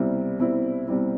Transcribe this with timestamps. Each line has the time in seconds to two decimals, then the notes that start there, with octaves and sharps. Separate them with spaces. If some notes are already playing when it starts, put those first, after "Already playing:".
Already playing: C2 B2 G3 C4 E4
0.39 C2 B2 G3 C4 E4
0.87 C2 B2 G3 C4 E4